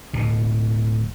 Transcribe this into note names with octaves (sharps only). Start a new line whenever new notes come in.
D1 B2